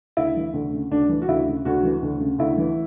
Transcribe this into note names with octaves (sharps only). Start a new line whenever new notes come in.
D2 E4
E3
D2
C#3
D2 D4
E3
F#4
D2 E4
C#3
D2 F#4
E3
D2
C#3
D2 E4
E3